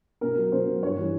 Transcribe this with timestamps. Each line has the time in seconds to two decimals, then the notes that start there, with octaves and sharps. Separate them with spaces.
0.21 B2 A#4
0.37 F#3
0.52 B2 C5
0.68 F#3
0.82 G2 C#5
0.98 E3 G3